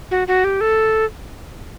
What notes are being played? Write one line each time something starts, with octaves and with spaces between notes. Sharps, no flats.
F#4
F#4
G4
A4